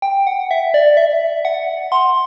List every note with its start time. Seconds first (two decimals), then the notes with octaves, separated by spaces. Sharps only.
0.02 G5
0.27 F#5
0.51 E5
0.74 D5
0.97 E5
1.45 F#5
1.92 C6